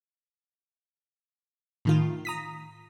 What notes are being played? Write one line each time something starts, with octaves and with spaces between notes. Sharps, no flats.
A2 D#3 F4
A#5 D#6 B6